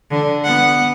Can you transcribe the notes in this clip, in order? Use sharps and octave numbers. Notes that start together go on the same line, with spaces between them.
D3
B3 F#5